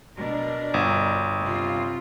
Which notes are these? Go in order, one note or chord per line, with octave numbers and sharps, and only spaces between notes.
B2 D4 A#4
G1
C3 F4